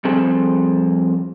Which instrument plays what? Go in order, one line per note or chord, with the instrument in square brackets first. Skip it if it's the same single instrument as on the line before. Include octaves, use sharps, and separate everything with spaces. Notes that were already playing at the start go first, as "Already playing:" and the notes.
[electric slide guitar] F2 G3 C4 G#4 A4